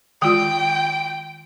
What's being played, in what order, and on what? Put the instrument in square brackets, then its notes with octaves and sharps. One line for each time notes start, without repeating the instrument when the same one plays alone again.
[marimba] D#3 G#3 F4 [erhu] G5